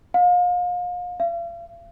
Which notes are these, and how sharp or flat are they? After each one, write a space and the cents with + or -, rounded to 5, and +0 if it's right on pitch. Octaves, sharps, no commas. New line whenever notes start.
F5 +35
F5 -40